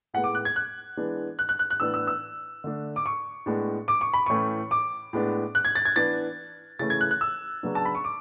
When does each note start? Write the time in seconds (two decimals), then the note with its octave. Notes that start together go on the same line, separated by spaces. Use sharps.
0.14 A2 G#3 B3 F#5
0.24 D6
0.35 F#6
0.45 G#6
0.56 F#6
0.97 E3 G#3 B3 D4
1.39 F#6
1.49 F#6
1.59 F#6
1.70 F#6
1.80 A2 E3 B3 D4 E6
1.94 E6
2.07 E6
2.64 D3 A3 D4
2.96 D6
3.06 C#6
3.46 A2 G#3 B3 D4
3.88 D6
4.01 C#6
4.13 B5
4.26 A2 E3 A3 C#4 C#6
4.71 D6
5.13 A2 G#3 B3 D4
5.55 F#6
5.65 G#6
5.75 A6
5.85 G#6
5.96 E3 B3 D4 A6
6.79 C#3 E3 A3 C#4 A6
6.90 G#6
7.01 F#6
7.11 F#6
7.21 E6
7.63 C#3 F#3 B3 D4
7.75 A5
7.85 B5
7.95 C#6
8.04 D6